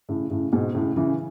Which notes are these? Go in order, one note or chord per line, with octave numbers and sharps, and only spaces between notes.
A2 C#3
A2 C#3
G#2 B2
A2 C#3
C#3 E3